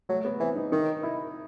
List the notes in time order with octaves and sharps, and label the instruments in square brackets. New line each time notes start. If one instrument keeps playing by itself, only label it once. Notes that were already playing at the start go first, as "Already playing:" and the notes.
[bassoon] F#3 [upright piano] A3
[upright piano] B3
[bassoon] E3 [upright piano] C4
[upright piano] D#4
[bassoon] D#3 [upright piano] D#4
[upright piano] E4